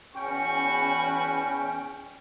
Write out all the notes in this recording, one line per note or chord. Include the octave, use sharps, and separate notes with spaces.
E2 C#4 F#4 B4 G5 C#6